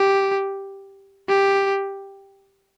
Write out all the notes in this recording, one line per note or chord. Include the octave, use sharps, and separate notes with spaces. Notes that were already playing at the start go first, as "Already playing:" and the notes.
Already playing: G4
G4